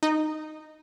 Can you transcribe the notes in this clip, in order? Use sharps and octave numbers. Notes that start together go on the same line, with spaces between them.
D#4